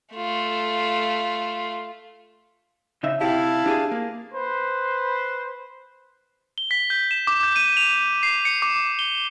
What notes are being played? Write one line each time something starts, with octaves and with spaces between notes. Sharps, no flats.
A3 F4
C#3 D#4 E5
C3 E4 G4 F5 A5
D4 G4 G#4
A#3
B4 C5
G7
B6
G6
E7
D6
G6
D#7
F7
C7
C#7
D6
G7